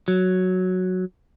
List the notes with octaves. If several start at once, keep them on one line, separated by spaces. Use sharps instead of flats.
F#3